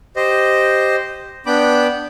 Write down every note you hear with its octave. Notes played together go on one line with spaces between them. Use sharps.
G4 C5 D#5
B3 D4 G5 B5 D6